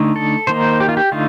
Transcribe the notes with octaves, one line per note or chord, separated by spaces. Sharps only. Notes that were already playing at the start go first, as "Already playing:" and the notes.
Already playing: D3 A3 D#4
A4
D#3 A#3 D#4 C5
G4
F4
G4
D3 A3 D#4 F4